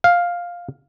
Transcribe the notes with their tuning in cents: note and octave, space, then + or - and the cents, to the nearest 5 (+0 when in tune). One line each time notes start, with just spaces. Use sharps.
F5 +5